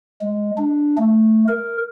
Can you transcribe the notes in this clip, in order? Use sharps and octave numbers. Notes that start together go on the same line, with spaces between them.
G#3
D4
A3
A#4